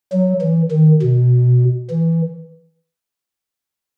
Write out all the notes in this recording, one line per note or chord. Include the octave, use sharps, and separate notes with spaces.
F#3
E3
D#3
B2
E3